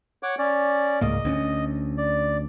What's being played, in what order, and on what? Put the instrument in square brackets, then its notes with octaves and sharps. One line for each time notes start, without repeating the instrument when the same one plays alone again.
[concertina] C#5 F#5 D6
C#4 D5
[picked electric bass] C#2 G#2 A#3 [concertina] D#5
[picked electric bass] D2 C4 C#4
[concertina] D5